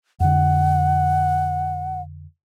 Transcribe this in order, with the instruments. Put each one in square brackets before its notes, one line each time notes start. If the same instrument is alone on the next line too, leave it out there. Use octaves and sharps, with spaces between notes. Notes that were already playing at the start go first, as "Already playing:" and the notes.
[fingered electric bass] F2 D3 [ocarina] F#5